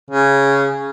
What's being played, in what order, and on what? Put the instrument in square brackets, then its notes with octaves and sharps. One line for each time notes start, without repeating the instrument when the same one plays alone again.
[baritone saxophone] C#3